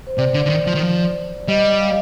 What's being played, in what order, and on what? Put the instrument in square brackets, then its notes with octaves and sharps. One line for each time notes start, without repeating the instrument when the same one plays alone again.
[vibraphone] C5
[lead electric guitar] C3 [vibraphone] D5
[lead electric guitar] D3
D3
D#3
F3
D#3
F3
[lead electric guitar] G3 [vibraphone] D#5
[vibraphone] F5